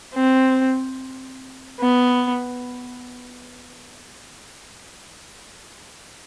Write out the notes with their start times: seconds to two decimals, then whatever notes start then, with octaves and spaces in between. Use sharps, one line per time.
0.14 C4
1.80 B3